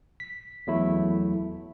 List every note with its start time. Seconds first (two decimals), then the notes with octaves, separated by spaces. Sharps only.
0.20 B6
0.67 E2 F#3 A3 E4